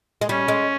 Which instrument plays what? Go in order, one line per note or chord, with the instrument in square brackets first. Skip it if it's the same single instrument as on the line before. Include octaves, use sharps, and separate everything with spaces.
[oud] G#3
[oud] G3 [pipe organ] C#4
[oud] G#3